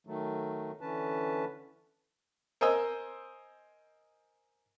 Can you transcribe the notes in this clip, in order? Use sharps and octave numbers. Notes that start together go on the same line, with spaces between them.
D#3 F#3 A3
D3 E3 C#4 B4 A5
A#4 C5 D#5 G#5 E6